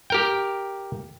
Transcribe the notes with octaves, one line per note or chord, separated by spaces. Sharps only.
G4 A#4 G5